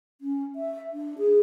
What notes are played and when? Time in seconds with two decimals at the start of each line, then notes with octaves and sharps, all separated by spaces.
0.21 C#4
0.56 E5
0.93 D4
1.18 G#4